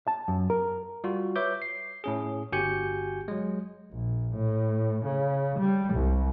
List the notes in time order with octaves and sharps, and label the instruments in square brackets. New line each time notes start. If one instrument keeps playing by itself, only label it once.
[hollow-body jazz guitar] A5
F#2
A#4
[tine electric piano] G3 F4 F#4
B4 C#5 E5 D6 G6
C7
A2 C#4 G#4
G1 F#4 G4 G#5 G6 C#7
F#3 G#3
[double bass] A#1
A2
C#3
G3
C2